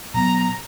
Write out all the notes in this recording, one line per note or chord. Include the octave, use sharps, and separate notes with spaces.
B2 F#3 B3 A#5